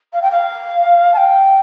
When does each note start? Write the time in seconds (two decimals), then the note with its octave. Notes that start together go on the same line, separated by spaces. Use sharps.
0.13 F5
0.22 G5
0.31 F5
1.14 A5
1.17 G5